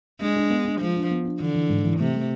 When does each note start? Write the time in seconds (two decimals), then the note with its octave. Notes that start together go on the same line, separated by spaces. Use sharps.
0.21 G#3 D4
0.36 D4
0.50 B3
0.65 D4
0.81 F3 G#3
0.96 D4
1.11 B3
1.25 D4
1.40 D3 E3
1.55 E3
1.69 G#2
1.85 E3
1.99 C3 A3
2.15 A3